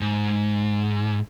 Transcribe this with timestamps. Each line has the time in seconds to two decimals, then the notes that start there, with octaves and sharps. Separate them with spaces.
0.01 G#2